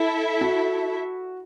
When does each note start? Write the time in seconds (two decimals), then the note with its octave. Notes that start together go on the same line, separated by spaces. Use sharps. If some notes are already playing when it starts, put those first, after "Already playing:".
Already playing: E4 A4 E5
0.41 F#4